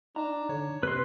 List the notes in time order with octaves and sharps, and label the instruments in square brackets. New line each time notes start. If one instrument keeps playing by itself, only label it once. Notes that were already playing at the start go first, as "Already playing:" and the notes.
[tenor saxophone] D4 [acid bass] D#4 [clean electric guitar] A#5
[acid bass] D3 [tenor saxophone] C#5
[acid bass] C3 [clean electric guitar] C4 [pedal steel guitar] B4 C6